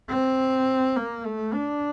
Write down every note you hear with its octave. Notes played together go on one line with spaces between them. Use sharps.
C4
A#3
A3
D4